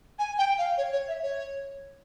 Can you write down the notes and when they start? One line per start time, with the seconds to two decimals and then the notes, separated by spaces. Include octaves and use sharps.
0.19 G#5
0.38 G5
0.58 F5
0.78 C#5
0.92 C#5
1.08 E5
1.23 C#5